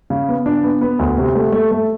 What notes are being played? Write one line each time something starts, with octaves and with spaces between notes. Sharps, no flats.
C#3
B3
D4
B3
B3
D2
C3
A3
A3
A3